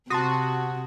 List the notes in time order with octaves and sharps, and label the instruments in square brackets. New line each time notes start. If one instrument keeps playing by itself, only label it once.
[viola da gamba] C3 [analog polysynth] F#4 [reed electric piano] A5 C6 D#6